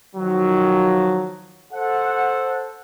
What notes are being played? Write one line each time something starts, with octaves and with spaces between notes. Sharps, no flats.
D#3 F3 F#3
A4 C5 F#5